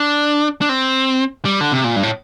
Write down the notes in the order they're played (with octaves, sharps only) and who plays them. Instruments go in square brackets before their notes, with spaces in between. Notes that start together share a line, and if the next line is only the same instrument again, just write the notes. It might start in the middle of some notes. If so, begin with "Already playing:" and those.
Already playing: [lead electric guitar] D4
D4
C4
G3
D3
C3
A#2
G2
A2